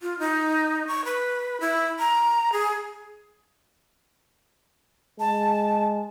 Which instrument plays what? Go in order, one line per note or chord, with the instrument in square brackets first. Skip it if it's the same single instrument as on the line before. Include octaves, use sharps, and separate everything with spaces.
[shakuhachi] F4
D#4
C#6
B4
E4
A#5
G#4
[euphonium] G#3 [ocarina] A5